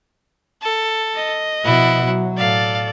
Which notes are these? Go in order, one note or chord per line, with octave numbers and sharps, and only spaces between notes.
A4
D#5
B2 F3 E4 F#5
F#3
A2 A4 D5 F5